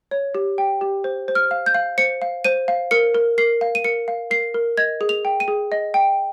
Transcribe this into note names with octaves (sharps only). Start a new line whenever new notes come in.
C#5
G4
G5
G4
C5
C5
F6
F5
G6
F5
C5 C#7
F5
C5 D#7
F5
A#4 C#7
A#4
A#4 C7
F5
D#7
A#4 C#7
F5
A#4 C7
A#4
D#5 G#6
G#4
F7
G5
D#7
G#4
D#5
G5